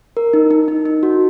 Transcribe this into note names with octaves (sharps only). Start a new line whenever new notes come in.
A#4
D#4
D#4
D#4
D#4
F#4